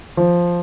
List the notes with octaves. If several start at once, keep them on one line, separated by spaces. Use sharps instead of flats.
F3